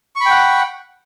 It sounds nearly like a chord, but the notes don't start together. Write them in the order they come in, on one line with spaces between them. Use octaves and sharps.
C#6 B5 G5 F#5